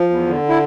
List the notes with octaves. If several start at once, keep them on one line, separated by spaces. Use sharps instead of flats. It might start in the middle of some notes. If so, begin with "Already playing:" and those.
Already playing: F3
E2
D3
E4